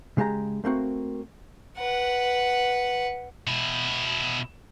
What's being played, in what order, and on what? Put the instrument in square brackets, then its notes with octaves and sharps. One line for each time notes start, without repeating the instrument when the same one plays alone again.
[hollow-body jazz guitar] C#3 G#3 G4 D#5 A#5
A3 A#3 C4 F#4
[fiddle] B4 F#5
[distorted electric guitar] B2 E4